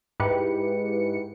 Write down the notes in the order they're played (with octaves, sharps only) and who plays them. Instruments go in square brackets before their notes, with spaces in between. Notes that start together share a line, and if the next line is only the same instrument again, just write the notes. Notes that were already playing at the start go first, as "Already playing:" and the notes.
[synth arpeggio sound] G#2 E4 G4 B4 C#7